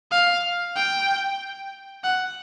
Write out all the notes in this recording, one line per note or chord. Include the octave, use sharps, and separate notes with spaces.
F5
G5
F#5